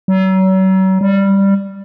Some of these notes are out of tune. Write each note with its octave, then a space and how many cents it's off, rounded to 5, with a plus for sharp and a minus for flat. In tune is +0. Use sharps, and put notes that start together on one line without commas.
F#3 +40
G3 +5